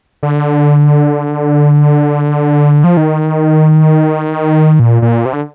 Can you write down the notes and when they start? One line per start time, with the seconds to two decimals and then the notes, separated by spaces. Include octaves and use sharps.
0.23 D3
2.84 F3
2.97 D#3
4.80 A#2
5.02 A#2
5.26 C3
5.33 D3